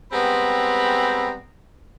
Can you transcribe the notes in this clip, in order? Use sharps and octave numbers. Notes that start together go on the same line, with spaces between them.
G3 G#3 B3 C4 A#5 B5